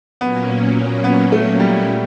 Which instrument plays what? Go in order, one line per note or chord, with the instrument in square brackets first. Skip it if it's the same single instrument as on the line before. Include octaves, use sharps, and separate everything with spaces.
[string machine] A#2 F#3 A#3 C#4 [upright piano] B3
[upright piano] B3
A3
G3